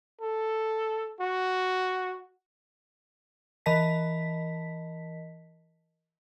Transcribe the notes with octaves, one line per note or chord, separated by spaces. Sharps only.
A4
F#4
E3 A#4 D#5 A5 B6